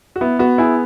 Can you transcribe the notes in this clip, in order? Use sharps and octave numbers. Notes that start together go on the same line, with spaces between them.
F#4
B3 E4
B3 F#4
E4 G#4